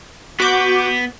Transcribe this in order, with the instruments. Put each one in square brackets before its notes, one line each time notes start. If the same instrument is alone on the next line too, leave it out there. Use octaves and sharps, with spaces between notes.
[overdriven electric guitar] B3 [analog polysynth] F#4 D6 G6